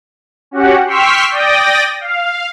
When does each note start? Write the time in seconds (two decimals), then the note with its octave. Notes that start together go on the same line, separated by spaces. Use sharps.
0.51 C#4 F#4 G4 F#5
0.86 G5 C6 C#6 E6 F6 B6
1.31 D5 G5 D#6 A#6
2.01 F5